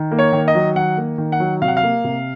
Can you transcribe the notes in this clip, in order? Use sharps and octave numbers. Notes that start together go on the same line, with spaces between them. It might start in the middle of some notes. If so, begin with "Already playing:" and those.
Already playing: D#3
A#3
C#5
D#3
D#5
F#3
D#3 F#5
A#3
D#3
F#5
F#3
C3 F5
F#5
F5
A#3
C3